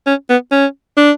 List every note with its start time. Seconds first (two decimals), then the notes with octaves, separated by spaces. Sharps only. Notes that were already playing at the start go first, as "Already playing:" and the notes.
0.07 C#4
0.30 B3
0.52 C#4
0.97 D4